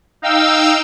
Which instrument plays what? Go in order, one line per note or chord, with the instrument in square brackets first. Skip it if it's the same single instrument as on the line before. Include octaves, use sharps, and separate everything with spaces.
[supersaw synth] D#4 F5 G5 E6